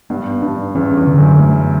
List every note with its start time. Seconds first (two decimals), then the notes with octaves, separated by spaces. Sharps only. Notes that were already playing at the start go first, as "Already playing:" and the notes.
0.10 G2 B3
0.42 G2 D4
0.75 E2 C#4
0.97 E2
1.07 D3
1.18 F#2
1.39 A3